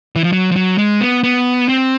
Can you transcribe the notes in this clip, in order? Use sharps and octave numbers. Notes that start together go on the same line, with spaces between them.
E3
F3
F#3
F3
F#3
G#3
B3
B3
C4